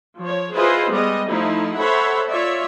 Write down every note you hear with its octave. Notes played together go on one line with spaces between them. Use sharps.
F3 C#5
E4 F4 G#4 B4 C5 D#5
G3 G#3 B3 D#5
F3 A3 D#4 E4
A4 C5 C#5 E5 F#5 B5
F4 C#5 D5 E5